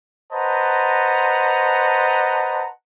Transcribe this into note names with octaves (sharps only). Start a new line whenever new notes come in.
B4 C5 D#5 F#5 A5 A#5